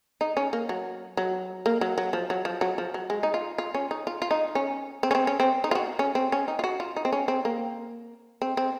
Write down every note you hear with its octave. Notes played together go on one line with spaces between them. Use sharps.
D#4
C#4
A#3
F#3
F#3
A#3
F#3
F#3
F3
F#3
F3
F#3
F3
F#3
G#3
D#4
F4
F4
C#4
D#4
F4
F4
D#4
C#4
C4
C#4
C4
C#4
C4
D#4
F4
F#4
C#4
C4
C#4
D#4
F4
F#4
F4
D#4
C4
C#4
C4
A#3
C4
C4